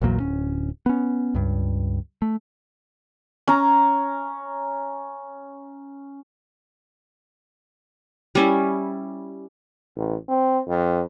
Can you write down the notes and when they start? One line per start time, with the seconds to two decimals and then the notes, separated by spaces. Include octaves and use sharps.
0.02 A#1 E2 A#2 F#3
0.20 D1 C#4
0.86 B3 C#4
1.34 C#2 G2
2.22 A3
3.48 C#4 A#5
8.35 G3 C#4 E4
9.96 A1
10.28 C4
10.68 F2